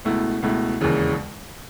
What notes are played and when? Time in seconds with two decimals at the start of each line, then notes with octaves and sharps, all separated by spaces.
0.05 C#2 B2 A3 E4
0.42 C#2 B2 A3 E4
0.81 E1 D#2 C#3 E3